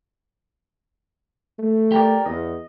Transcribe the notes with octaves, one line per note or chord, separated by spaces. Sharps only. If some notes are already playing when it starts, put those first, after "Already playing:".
A3
G4 A#4 D5
E2 D#5